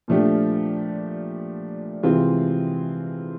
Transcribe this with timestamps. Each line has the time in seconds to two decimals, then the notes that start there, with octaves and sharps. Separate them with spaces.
0.08 A#2 F3 A3 D4 G4
2.03 C3 E3 G#3 C4 F4